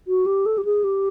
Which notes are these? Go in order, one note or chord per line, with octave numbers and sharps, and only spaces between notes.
F#4
G4
A4
G4
G#4
G4